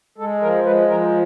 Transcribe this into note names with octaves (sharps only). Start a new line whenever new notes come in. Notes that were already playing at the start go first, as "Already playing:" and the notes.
G#3 A4
F3 A#4
G#3 B4
F3 A#4